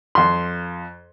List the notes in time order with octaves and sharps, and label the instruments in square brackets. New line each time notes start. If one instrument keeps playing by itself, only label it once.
[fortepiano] F2 C6